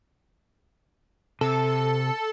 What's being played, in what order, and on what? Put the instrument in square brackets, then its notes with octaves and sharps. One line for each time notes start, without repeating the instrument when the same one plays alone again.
[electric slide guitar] C3 [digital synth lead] A4